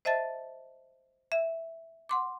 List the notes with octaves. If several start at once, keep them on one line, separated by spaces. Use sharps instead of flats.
C5 D#5 E5 A5 A6
E5
F#5 C6 D6